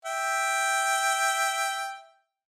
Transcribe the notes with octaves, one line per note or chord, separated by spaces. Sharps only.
E5 G5